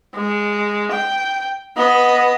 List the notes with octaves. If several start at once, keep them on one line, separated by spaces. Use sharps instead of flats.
G#3
G5
B3 D#5